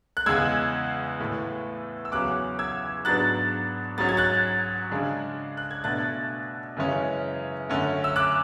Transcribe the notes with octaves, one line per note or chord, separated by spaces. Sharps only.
F#6
E2 C#3 G#3 E6 G#6
A2 E3 A3
E6
E2 C#3 F#3 C#4 D6 F#6
E6 G#6
G#2 F#3 B3 D4 F#6 A6
G#2 F#3 C#4 A6
G#6
F#6 A6
C#3 G#3 D4
F#6
G#6
B2 A3 D4 F#6 A6
F#2 C#3 E3 G#3 C#4
F#2 D3 A3 C#4
E6
D6 F#6